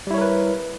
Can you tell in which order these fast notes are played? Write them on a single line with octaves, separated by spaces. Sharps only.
G3 E4 C#5 A#4 B4